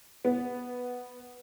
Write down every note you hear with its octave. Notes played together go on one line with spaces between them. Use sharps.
B3